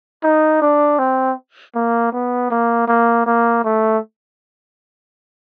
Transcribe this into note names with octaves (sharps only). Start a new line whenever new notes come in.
D#4
D4
C4
A#3
B3
A#3
A#3
A#3
A3